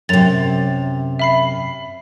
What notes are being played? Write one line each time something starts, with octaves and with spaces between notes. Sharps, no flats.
F#2 C3 A6 F7
E5 B5 C7